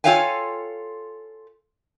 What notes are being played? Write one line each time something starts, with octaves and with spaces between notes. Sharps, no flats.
F4 A4 C#5 F5 G5 G#5